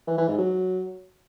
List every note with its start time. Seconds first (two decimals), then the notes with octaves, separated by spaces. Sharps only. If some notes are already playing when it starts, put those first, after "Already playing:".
0.07 E3
0.18 E3
0.28 G#2
0.38 F#3